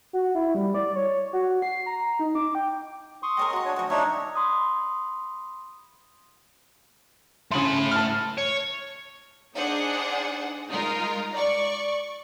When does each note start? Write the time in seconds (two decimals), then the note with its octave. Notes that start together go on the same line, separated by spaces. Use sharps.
0.13 F#4
0.35 E4
0.55 G3
0.74 D5
0.96 C#5
1.33 F#4
1.62 C7
1.86 A#5
2.19 D#4
2.35 D6
2.55 G5
3.23 C6 C#6 D#6
3.37 G#3 A#4 C#5 D#5 G5
3.53 F#4 C#6
3.65 D4 C#5
3.76 D2 F3 F#3 F#4 C#6
3.90 D4 D#4 C#5 E5
4.35 B5 C6 D#6
7.52 C#3 A3 B5 C6
7.91 A5 F6
8.38 C#5
9.55 D4 D#4 G#4 C5 F#5
10.69 G#3 D#4 F4 A#4
11.33 D5 C#6